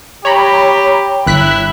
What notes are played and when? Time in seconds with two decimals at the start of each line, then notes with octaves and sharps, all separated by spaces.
0.25 G4 C#5 A#5 B5
1.26 G1 E4 F#6 B6